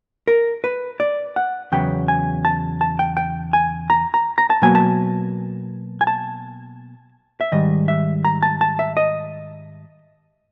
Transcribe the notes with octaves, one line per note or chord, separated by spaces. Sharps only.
A#4
B4
D5
F#5
E2 C#3 F#3 B3 G5
G#5
A5
A5
G5
G5
G#5
A#5
A#5
A#5
A5
B2 F#3 A#3 G#5
A5
G#5
A5
E5
G#2 D#3 G3 D#5
E5
A#5
A5
A5
E5
D#5